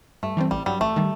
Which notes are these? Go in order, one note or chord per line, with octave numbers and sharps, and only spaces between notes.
G2 A3
E3 G3 C4
A1 G3
G2 F#3 G3
A1 A3
D#3 G3